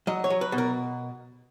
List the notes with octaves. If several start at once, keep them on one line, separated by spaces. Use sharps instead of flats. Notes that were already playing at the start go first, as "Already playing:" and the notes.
F#3 D#5
C#5
F#3
B4
B2
A#4